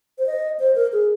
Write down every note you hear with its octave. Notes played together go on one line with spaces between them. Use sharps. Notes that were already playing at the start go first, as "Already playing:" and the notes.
C5
D#5
C5
A#4
G#4